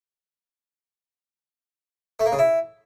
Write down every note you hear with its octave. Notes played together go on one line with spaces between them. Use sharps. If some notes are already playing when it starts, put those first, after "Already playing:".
A3
A#3
C#3
E4